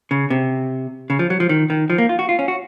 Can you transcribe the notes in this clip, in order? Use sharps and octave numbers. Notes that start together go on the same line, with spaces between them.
C#3
C3
C#3
F3
F#3
F3
D#3
D#3
F3
A#3
F4
F#4
F4
C#4
F#4